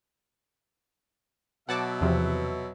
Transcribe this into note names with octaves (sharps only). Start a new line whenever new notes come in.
B2 F#3 E5 F#5 A5 D6
E2 C3 F3